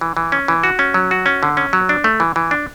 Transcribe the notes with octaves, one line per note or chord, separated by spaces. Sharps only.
E3
E3
C#4
E3
F#4
C#4
F#3
F#4
C#4
D3
C#4
F#3
D4
A3
E3
E3
D4